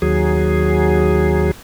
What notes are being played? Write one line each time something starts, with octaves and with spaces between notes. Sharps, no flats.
D#2 F#3 G#4